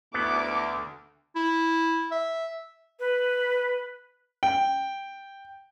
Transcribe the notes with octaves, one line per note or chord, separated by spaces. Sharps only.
D2 A3 B3 E4 D6
E4
E5
B4
G5